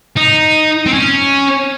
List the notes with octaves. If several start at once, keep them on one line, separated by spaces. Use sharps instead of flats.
D#4
C4
C#4